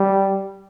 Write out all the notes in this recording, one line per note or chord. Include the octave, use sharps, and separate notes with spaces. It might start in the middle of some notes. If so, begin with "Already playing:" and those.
Already playing: G3